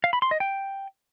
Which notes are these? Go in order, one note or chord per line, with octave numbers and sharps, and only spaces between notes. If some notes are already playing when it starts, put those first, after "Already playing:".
F5
B5
C6
D#5
G5